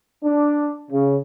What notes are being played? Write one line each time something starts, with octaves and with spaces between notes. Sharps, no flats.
D4
C#3